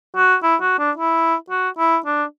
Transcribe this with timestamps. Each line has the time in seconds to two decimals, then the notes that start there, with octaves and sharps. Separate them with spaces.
0.16 F#4
0.43 E4
0.61 F#4
0.78 D4
0.97 E4
1.50 F#4
1.78 E4
2.05 D4